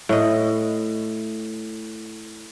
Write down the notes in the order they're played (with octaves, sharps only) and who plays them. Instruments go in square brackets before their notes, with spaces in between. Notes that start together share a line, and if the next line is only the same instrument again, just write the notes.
[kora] A2 D#5